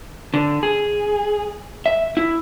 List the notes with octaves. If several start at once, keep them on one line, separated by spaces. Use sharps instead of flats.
D3
G#4
E5
E4